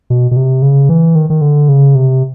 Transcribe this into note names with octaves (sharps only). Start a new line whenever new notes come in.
B2
B2
C3
C#3
E3
D#3
D#3
D3
C#3
C3